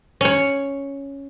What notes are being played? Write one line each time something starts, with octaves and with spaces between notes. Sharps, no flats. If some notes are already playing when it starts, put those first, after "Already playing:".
C#4 C#5